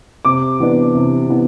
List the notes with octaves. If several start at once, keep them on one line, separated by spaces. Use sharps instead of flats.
C3 D6
E3 B3 D4
C3
E3 B3 D4